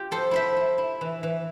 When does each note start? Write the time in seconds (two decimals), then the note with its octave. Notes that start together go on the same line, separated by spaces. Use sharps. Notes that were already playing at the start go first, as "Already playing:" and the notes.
Already playing: F4 G4
0.11 F3 A4 C5
0.31 E4 C5 E5
0.56 E4
0.78 E4
1.01 E3
1.23 E3